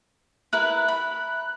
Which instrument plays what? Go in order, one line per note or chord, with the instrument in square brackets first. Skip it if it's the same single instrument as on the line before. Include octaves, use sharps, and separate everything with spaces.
[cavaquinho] E4 A#4 B4 [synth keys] F#6
[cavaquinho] B5